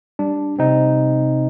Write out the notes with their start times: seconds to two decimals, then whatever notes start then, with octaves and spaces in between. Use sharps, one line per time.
0.19 G3 D4
0.59 C3 C4 D#4